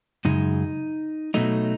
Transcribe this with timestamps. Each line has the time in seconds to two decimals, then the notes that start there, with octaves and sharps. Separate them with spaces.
0.25 F#2 C#3 G#3 D#4
1.34 B2 F#3 A3 D#4